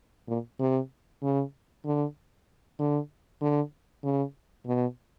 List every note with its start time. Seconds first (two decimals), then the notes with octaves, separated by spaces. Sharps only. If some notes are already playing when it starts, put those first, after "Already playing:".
0.28 A#2
0.60 C3
1.23 C#3
1.85 D3
2.79 D3
3.41 D3
4.04 C#3
4.67 B2